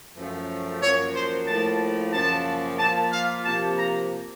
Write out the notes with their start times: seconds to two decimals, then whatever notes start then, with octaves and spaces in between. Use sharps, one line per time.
0.16 F#2 F3 A3
0.82 F#2 F3 A#3 C#5
1.15 C5
1.47 A2 F3 A#3 A5
2.13 F#2 C#3 F3 A#3 A5
2.79 A#2 F3 A#3 A5
3.13 F5
3.45 C3 F3 A#3 A5
3.78 A#5